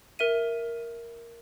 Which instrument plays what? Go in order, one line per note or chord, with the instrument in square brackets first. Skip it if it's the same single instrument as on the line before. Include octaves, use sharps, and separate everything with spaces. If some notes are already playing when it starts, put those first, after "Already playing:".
[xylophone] A#4 E5 D#7